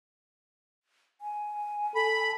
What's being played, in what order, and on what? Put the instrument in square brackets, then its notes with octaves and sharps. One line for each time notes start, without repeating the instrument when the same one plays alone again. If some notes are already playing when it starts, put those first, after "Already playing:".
[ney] G#5
[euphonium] A4 [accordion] B5